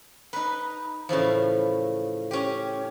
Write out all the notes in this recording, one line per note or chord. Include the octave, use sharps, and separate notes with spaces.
D#4 B4
A2 C#3 E3 F3
C#4 G4